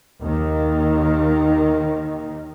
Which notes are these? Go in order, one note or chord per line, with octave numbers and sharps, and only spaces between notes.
D#2 D#3